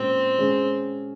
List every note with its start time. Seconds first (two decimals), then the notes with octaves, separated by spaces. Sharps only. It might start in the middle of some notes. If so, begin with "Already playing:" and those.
Already playing: A#2 G#3 C4 C#4
0.38 G#3 C#4 G#4